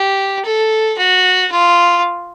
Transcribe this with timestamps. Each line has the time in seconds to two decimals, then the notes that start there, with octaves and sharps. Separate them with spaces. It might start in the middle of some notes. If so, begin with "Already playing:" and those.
Already playing: G4
0.44 A4
0.98 F#4
1.52 F4